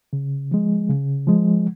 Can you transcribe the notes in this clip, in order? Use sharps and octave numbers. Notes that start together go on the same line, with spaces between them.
C#3
F3 G#3
C#3
F3 G#3